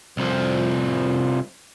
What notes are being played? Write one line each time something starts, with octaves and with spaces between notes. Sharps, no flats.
C2 F3